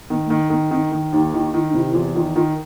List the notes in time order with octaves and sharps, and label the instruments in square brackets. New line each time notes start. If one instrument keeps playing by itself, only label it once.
[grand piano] D#3 [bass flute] B3
[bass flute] A3
[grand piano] D#3 [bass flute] A#3
[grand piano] D#3 [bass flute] B3
[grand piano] D#3 [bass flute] C4
[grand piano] D#3
[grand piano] D#2 [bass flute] D#4
[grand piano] D#3 [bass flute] E4
[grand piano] D#3 [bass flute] E4
[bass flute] D#4
[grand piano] C3 [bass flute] E4
[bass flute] E4
[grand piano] E2 [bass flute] F4
[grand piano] D#3 [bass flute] F4
[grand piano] D#3 [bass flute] F4